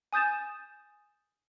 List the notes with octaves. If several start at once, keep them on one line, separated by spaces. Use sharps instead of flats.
G#5 D#6 G6 A6 E7